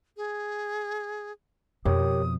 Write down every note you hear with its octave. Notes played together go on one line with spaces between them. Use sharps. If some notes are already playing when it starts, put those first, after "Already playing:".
G#4
F2 B2 G4 A#4 C#5 D#6